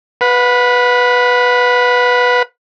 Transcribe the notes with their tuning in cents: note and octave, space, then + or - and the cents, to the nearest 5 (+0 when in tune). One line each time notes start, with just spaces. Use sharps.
B4 +0 F#5 -40